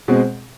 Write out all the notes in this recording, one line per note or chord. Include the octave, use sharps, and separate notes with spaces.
B2 G#3 C4